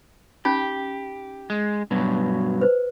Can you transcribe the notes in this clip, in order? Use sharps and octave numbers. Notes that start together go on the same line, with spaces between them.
C#4 D#4 G4 B5
G#3
G2 B2 F#3
B4 C5